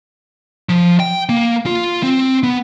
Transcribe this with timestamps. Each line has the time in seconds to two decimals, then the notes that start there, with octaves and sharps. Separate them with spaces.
0.69 F3
1.00 G5
1.29 A#3
1.66 F4
2.03 C4
2.43 B3